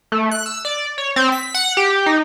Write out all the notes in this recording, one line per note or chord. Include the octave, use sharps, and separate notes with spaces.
A3
F#6
E6
D5
C#5
C4
B6
F#5
G4
D#4